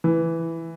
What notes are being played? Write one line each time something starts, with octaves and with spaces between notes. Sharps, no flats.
E3